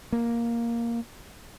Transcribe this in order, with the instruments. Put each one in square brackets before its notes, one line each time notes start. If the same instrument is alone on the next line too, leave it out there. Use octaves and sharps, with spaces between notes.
[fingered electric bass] A#3